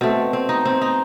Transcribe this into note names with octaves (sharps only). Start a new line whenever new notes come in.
B2 A3 C4
C4
D#4
C4
D#4